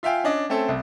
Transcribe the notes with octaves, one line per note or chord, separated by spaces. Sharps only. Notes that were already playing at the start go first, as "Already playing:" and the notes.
F4 E5 F5 G5 G#5
C#4 D4 D#5
A3 C4 C#4 A4
C2